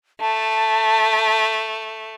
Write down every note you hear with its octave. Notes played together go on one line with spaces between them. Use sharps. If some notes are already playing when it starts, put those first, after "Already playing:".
A3 A5